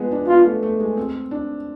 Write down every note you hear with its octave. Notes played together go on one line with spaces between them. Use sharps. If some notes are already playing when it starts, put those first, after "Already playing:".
Already playing: F3 G#3 B3
D4
B3 F4
A3
A3
G#3
C4
D4